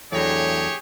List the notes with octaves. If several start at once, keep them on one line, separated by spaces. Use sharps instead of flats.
E2 A2 F#3 D4 G4 G#4 C#5